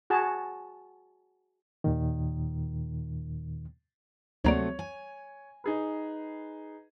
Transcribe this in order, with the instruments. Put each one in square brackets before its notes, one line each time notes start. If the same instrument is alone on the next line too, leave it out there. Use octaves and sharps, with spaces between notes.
[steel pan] F#4 G#4 A5
[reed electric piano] D#2 A#2 D#3
[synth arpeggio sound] D2 A#3 D5 [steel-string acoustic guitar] C3 F#3 A3 [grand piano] C#5 F7
[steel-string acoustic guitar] G#5
[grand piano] D#4 G#4 B4